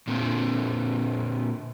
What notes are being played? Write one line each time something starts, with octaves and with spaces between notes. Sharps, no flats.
A#2 D3 C4